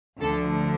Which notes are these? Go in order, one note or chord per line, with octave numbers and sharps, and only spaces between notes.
D2 D3 F3 A4